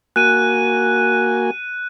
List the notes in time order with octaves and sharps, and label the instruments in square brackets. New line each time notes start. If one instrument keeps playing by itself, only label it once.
[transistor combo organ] A#3 F#4 G#5 [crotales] F#6 D#7